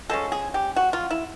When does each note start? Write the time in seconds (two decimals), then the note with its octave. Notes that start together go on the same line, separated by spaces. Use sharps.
0.09 F3 G#3 C#4 A4
0.32 G#4
0.54 G4
0.76 F#4
0.93 F4
1.11 E4